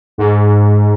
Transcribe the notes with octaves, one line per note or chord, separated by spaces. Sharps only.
G#2